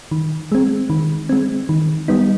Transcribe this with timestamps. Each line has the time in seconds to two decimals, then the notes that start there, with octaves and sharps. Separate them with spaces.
0.11 D#3
0.52 G#3 C4
0.90 D#3
1.29 G#3 C4
1.69 D#3
2.08 G3 B3 D#4